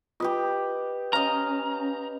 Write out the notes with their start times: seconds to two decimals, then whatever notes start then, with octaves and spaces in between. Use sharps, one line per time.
0.20 F4 G4 B4 D#5 D#6
1.13 C#4 D#5 F5 A#5